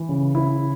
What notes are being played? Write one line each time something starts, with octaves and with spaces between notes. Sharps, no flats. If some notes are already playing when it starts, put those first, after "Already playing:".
Already playing: E3
C#3
C#3 E4